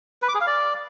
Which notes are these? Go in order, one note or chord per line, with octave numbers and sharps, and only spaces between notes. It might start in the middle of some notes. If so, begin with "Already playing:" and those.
B4
D6
G#4
F5
D5